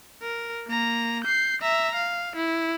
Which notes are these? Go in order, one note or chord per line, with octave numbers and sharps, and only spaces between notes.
A#4
A#3 A#5
G6 C7
E5 A#5
F5
E4